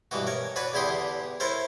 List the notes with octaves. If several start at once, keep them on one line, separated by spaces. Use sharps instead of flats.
G2 B2 E3 F#4
A#4 C#5
D4 F#4 B4 C#5
E2 D3 E4 G4 C6 D#6
E4 A4 A#4 C5 C#5